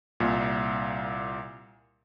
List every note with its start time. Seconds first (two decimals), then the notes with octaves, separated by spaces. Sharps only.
0.20 C2 A#2